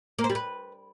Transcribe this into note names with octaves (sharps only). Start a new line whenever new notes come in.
A#3
C5
G3
B4